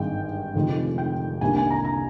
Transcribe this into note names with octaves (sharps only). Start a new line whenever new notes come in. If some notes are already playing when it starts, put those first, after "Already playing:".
Already playing: G#1 G2 D#3 G#3 G5
F1 F2 D#3 G#3
G5
C2 C3 D#3 A#3 D4 G#5
G#5
A#5
A#5